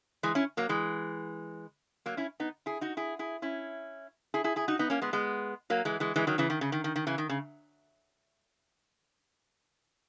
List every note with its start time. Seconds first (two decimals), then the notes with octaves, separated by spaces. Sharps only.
0.23 E3 G#3
0.35 C#4 E4
0.57 F#3 A#3
0.69 E3 G#3
2.06 F#3 A#3
2.17 C#4 E4
2.40 B3 D#4
2.66 E4 G#4
2.81 D#4 F#4
2.97 E4 G#4
3.19 E4 G#4
3.42 C#4 E4
4.34 E4 G#4
4.44 E4 G#4
4.56 E4 G#4
4.68 D#4 F#4
4.79 B3 D#4
4.90 A#3 C#4
5.02 G#3 B3
5.13 G#3 B3
5.70 F#3 A#3
5.85 E3 G#3
6.00 E3 G#3
6.16 E3 G#3
6.27 D#3 F#3
6.38 C#3 E3
6.50 D#3
6.61 C#3
6.72 D#3
6.84 D#3
6.96 D#3
7.07 C#3 E3
7.18 D#3
7.29 C#3